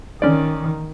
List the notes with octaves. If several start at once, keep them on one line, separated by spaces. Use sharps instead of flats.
D#3 C#4 D5